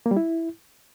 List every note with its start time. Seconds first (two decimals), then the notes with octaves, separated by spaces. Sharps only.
0.06 A#3
0.11 G3
0.17 E4